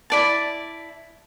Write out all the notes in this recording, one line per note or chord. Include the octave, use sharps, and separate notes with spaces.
E4 D5 A5